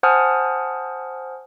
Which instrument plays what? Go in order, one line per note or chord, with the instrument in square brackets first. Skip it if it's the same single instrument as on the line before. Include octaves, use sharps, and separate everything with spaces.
[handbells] C5 F#5 G#5 A5 D#6 F6